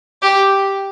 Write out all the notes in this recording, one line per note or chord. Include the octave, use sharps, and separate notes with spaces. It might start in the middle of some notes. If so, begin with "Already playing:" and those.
G4